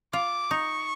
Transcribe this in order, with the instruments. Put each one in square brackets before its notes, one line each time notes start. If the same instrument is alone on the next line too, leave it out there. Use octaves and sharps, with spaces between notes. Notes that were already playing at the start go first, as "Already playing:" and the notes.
[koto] F4 [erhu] D6
[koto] D#4 [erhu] C#6